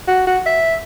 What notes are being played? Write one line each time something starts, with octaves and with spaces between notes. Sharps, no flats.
F#4
F#4
E5